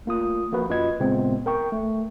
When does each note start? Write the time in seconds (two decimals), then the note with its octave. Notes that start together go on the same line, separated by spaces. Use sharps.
0.06 A3 A#3 F4 D#6
0.52 F3 A#3 F#4 B4
0.69 F#2 C#4 F4 B4 D#5 G#6
1.00 A#2 C#3 G#3 B3 C4
1.46 A#4 G5 C#6
1.72 A3